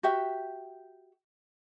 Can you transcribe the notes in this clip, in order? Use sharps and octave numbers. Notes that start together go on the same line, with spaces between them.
F#4 G4 E5